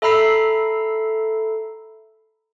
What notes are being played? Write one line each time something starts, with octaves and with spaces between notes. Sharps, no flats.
A4 E5 A#5 B5 E6 C7